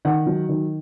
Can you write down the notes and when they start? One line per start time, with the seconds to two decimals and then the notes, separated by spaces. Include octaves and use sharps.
0.05 D#3 F#5
0.26 F#3
0.49 D#3